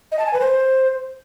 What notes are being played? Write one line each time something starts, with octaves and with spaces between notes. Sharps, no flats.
D#5
A5
G#5
B4
C5